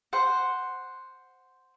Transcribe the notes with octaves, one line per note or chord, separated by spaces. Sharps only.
C5 F#5